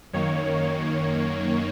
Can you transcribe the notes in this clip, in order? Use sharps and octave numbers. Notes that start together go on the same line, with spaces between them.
F#2 D#3 A#3 C#5